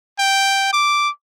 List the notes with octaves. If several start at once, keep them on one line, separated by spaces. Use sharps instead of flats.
G5
D6